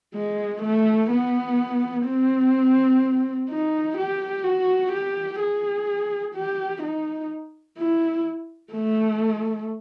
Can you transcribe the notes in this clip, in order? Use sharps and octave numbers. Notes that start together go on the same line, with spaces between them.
G#3
A3
B3
C4
D#4
G4
F#4
G4
G#4
G4
D#4
E4
A3